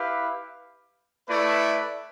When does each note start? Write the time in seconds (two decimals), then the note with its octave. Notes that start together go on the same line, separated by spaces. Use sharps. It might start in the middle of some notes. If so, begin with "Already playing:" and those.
Already playing: E4 G4 B4 F5
1.29 A3 E4 B4 D5